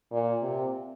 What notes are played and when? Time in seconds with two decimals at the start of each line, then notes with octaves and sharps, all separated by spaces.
0.11 A#2
0.42 C3